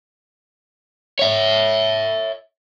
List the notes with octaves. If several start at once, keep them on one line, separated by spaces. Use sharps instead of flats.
C#5 E5